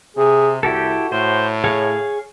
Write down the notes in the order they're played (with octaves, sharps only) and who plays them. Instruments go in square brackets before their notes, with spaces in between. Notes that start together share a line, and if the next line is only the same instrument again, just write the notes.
[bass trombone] C3 [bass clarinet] G#4
[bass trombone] C2 [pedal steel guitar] E4 G4 A4 [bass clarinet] F#4
[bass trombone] A2 [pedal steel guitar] C5
[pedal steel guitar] G#4 C#5 F5